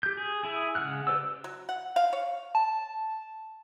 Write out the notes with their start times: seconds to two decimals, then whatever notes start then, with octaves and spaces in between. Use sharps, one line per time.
0.03 G4 G6
0.17 G#4
0.44 E4 G#4
0.75 C#3 G#3 F#5 F6 F#6
1.07 G4 B4 C5 D5 E6
1.44 F#3
1.69 F#5
1.96 F5
2.13 C#5
2.55 A5